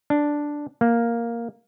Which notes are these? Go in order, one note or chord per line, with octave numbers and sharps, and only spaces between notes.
D4
A#3